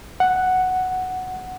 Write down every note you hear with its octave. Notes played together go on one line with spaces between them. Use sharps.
F#5